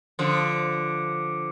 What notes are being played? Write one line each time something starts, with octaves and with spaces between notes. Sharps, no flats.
D3 F3